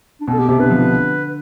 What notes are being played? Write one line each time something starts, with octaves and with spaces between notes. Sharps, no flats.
D4
B2 C4
A4
B2 G4
C3 G4
D3 B4
F3
D3